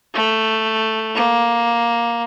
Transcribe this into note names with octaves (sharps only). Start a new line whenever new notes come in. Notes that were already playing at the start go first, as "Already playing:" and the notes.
A3
A#3